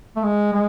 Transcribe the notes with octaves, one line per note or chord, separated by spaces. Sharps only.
A3
G#3
G#3